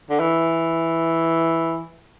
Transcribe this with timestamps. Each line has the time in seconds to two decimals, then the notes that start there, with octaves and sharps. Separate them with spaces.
0.10 D3
0.20 E3